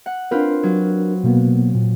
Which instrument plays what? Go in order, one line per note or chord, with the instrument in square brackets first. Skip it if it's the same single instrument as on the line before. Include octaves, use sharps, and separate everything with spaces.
[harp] F#5
[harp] C4 F4 B4 [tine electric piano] D4 A#4
[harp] F#3
[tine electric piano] B2 A#3 B3
A#2